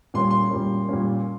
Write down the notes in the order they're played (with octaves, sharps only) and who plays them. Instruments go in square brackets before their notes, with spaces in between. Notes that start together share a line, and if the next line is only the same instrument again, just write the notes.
[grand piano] A#2 G3 A#3 C#4 [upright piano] C6
[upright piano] C6
[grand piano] A#2 G3 A#3 C#4
A#2 G3 A#3 C#4